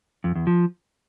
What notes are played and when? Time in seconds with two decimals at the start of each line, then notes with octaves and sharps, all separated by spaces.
0.24 F2
0.35 E2
0.47 F3